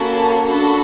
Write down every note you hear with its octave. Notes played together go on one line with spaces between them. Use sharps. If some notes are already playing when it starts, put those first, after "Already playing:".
Already playing: A#3 C#4 F#4 A4 A5 B5
D4 F#4 A4 A5 B5